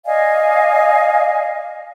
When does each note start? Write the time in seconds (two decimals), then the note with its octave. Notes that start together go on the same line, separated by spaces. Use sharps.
0.05 D5 D#5 F5 G#5